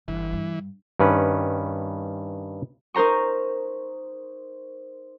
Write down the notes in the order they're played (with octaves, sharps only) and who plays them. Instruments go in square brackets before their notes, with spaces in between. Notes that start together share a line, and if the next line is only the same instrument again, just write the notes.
[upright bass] G1 [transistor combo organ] E3
[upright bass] G2
[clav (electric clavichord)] G2 D#3 C#4 B4
[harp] D#4 A#4 C5 A#5 C#6